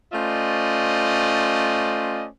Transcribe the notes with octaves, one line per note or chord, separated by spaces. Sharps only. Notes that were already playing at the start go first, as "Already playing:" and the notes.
A3 C#4 F4 C5 D5 D#5